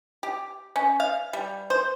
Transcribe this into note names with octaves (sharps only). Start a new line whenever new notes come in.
G4
C#4
F5
G3
C5